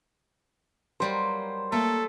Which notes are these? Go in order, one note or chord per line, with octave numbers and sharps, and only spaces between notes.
F#3 G3 A#3 C5
A3 A#3 A4